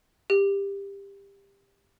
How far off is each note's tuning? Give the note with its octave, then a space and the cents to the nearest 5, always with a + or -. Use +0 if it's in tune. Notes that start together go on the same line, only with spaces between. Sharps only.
G4 +20